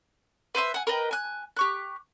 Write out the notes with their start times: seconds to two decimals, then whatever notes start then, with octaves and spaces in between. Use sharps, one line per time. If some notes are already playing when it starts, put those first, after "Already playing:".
0.55 B4 C5 E5 C6
0.74 F#5 G#5
0.87 A#4 B4 D#5 G5
1.11 G#5 F#6
1.57 G4 C#6 F#6